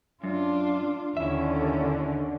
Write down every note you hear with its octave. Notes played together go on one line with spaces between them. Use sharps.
F#2 D4 F4
D#2 D3 C#4 E4 E5